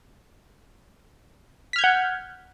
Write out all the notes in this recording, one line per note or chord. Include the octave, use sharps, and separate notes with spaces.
F#5 F6 G6 G#6 B6